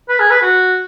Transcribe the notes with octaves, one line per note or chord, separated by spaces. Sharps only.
B4
G#4
B4
F#4